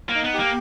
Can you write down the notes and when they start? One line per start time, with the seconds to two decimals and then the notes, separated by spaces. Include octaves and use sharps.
0.09 A#3
0.15 D#4
0.24 B3
0.34 G4
0.39 A#3